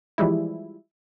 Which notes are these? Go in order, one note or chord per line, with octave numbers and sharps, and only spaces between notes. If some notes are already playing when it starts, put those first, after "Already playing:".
E3 F3 G3 G#3 E4